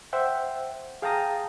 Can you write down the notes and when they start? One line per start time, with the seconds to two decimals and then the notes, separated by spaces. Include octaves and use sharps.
0.13 C5 E5 F#5 G5
1.02 G#4 F5 G5 A5 A#5 D#6